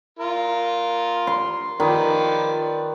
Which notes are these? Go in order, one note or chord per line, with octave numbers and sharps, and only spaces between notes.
F4 A#4
C6
D#3 F3 B4 D5